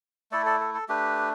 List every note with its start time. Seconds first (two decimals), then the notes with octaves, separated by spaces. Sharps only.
0.31 A3 E4 A4 D5
0.46 A4 D5
0.61 A4
0.74 A4
0.88 A3 D4 G4 B4